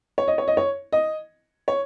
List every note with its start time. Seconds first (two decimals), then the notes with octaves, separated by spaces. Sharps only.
0.18 C#5
0.28 D#5
0.38 C#5
0.48 D#5
0.57 C#5
0.93 D#5
1.68 C#5